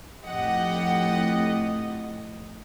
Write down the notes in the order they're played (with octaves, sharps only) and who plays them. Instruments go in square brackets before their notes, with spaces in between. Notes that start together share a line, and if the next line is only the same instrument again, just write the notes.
[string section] F2 A2 [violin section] G4 F#5 [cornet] D#5